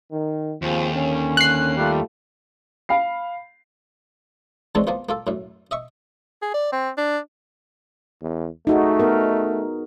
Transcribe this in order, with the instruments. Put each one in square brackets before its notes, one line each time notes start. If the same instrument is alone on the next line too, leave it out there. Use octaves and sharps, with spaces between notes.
[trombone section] D#3
[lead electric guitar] D#2 [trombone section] F3 C4 G#4
[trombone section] D3 C#4
[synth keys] F#6 C7
[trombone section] G3 A3 F4
[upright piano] F5 B5 C7
[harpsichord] D3 E3 G#3 A3 C4 C#4
F3 A#3 B3 F4
A#3 F4 A4
F#2 A2
D#5 E5 C#6
[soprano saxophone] G#4
D5
C4
D4
[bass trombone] E2
[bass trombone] A3 [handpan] D#4 F#4 G#4
[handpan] B3 A#4